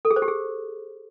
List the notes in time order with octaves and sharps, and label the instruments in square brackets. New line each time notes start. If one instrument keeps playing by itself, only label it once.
[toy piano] A4
G#4
C5
G4
G#4